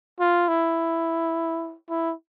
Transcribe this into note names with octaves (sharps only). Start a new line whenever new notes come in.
F4
E4
E4